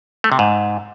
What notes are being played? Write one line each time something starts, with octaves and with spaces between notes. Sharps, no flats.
A3
C3
G#2